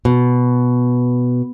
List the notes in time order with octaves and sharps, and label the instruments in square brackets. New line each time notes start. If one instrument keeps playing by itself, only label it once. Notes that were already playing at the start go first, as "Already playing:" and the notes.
[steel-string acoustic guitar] B2